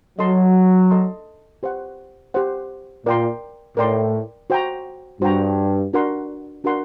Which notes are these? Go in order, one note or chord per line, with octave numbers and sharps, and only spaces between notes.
F#3 A4 D#5 A5 C6
A4 D#5 A5 C6
G4 C5 F#5
G4 C5 F#5
A#2 A#4 D5 G5 C6
A2 A#4 D5 G5 C6
F#4 C5 G5 A#5
G2 F#4 C5 G5 A#5
D4 F#4 A#4 F#5 C6
D4 F#4 A#4 F#5 C6